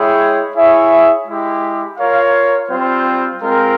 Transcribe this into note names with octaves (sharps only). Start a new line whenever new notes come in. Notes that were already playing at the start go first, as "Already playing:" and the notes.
Already playing: G#3 E4 G#4 C#5 G5
E4 G#4 C#5 E5
G#3 E4 G4
F4 A#4 C#5 F5
G3 C4 F4 C5
G#3 C4 F4 A#4